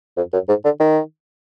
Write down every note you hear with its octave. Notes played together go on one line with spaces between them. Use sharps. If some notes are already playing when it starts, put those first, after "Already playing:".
F2
F#2
G#2
D3
D#3